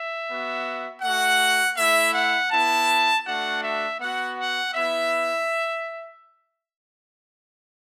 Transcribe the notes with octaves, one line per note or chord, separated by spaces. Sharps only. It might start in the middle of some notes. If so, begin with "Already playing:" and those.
Already playing: E5
B3 F#4
A3 F#4 F#5
A3 E4 E5
F#5
B3 E4 A5
A3 D4 F#4 F#5
E5
B3 F#4 F#5
F#5
B3 E4 E5